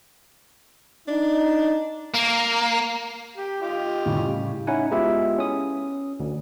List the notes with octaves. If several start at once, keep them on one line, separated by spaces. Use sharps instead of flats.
D4 D#4
A#3
G4
F4 G4 D#5
A2 C#3 G3
C#4 D#4 E4 F#5 G#5
G#3 B3 E4 F4 G4 E5
C#4 D#6
D2